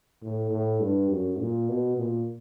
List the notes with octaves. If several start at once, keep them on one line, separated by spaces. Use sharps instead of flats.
A2
A2
G2
F#2
A#2
B2
A#2